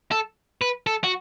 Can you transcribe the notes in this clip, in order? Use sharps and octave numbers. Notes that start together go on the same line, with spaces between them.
A4
B4
A4
F#4